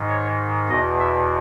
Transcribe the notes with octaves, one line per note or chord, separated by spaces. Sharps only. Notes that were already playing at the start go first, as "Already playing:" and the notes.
Already playing: G#2 D#3
C#5
E2 B2 D#5
E5